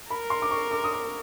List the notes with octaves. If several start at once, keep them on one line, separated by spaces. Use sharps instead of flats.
A#4 B5
C6
D6
C#6
D6
D#6
D6